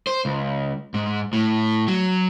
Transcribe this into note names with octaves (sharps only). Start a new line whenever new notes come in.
C5
C#2
G#2
A2
F#3